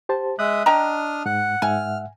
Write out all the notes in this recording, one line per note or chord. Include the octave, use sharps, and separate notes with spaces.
G4 C5 A5
G#3 E5 D#6 F#6
D4 D#5 G5 A#5 D#6 F6
G#2 F#5
G#2 E5 F#5 G#5 F6